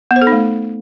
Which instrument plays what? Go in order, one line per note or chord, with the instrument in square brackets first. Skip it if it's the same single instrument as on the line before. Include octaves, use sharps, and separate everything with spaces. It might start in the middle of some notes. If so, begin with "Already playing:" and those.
[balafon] B3
C5
A4
D#4
A3